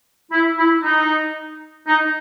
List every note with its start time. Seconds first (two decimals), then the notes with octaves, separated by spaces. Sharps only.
0.31 E4
0.57 E4
0.82 D#4
1.87 D#4